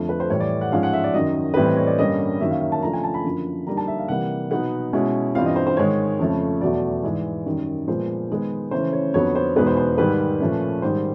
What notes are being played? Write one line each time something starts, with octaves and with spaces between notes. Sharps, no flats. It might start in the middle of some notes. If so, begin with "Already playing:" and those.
Already playing: F2 D3 F3 A3
B4
C5
A2 E3 G3 C#5
D5
F#5
G#2 F3 G#3 C#4 F5
F#5
E5
D5
F#2 D#3 F#3 D#5
A2 E3 G3 C4 B4
C5
C#5
D5
G2 D3 G3 A#3 C#4 D#5
F#2 D#3 F#3 A#3 C#4 E5
F5
E5
A5
C#3 F3 A3 D4 F4 A#5
G#5
A5
B5
F#2 D3 F3 A#3
D3 G3 A#3 D#4 A#5
A5
E5
F5
C3 E3 G3 A#3 F#5
B2 F#3 B3 D#4 F#5
B2 G#3 C#4 E4
G2 E3 G3 C4 F4 F5
D#5
C5
C5
G#2 D#3 G#3 C#5
F2 C#3 F3 A3
E2 B2 F#3 A3 D5
G#2 E3 G#3
F#2 D#3 G3
A#2 F3 G#3 B3 C5
D#3 G#3 B3
C#3 E3 A3 C#4 E4 C5
C#5
F2 D3 F#3 B3 C#5
C5
E2 B2 G#3 B3 D#4 B4
C5
C5
G#2 D#3 G3 B4
A#2 F3 A3 C#4
G#2 D#3 G3 C5